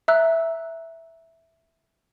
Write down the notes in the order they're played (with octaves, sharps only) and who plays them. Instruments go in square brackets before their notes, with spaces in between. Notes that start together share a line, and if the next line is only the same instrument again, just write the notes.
[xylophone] E5 A#5 E6 F#6